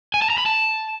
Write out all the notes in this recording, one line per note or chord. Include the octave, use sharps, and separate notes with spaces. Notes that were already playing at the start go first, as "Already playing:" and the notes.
G#5
A5
A#5
B5
A5